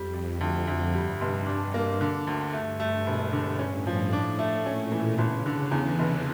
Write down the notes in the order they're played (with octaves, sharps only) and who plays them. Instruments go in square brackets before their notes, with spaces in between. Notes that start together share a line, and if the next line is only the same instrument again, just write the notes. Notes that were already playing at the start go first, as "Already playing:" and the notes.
Already playing: [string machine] F2 [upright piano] G3
[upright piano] G3
D2
D2
[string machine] G2 [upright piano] G3
[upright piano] F1
D4
A#3
D3
D2
[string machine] G2 [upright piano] A3
[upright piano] A3
E1
D3
[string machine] A2 [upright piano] C#4
[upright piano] F3
D4
A3
[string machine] A#2 [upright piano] C#4
[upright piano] E3
[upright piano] G1 [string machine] C#3
[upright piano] D3
[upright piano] E2 [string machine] E3
[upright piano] F1